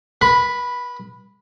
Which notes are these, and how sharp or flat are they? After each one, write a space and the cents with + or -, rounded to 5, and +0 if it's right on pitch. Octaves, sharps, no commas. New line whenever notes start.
B4 -40 B5 +0